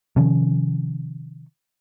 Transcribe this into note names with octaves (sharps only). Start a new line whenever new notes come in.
C3 D#3 F3 C#4